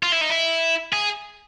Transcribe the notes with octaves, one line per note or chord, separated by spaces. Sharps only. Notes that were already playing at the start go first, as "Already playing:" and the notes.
F4
E4
D#4
E4
G#4